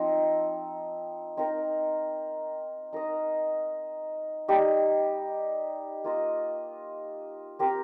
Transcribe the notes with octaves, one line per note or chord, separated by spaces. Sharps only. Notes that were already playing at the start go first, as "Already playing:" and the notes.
Already playing: F3 C4 D#4
C4 D#4 A#4
D#4 A#4 D#5
G3 D#4 G4 D#5
A#3 F4 D#5
C4 G4 A#4